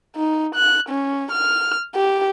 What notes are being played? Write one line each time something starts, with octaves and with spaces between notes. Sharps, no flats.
D#4
F#6
C#4
F6
G4